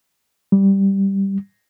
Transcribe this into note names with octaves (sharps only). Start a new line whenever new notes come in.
G3